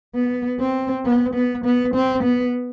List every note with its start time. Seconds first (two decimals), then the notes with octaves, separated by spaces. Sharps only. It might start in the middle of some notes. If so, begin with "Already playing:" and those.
0.15 B3
0.60 C4
1.05 B3
1.34 B3
1.64 B3
1.94 C4
2.24 B3